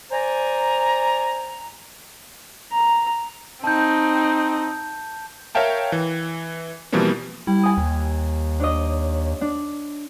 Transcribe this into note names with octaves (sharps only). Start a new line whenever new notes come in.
C5 D5 G#5 A#5
A#5
C4 D#4 A5 G6
A#4 C#5 E5 F5 G5 A5
E3
B2 E3 F3 G3 A#3 C4
G3 E4
G#5 D#6
D#2
D4 C#5 D#5
D4